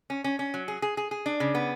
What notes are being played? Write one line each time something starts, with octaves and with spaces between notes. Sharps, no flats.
C#4
C#4
C#4
F#3
G#4
G#4
G#4
G#4
D4
C#3
B3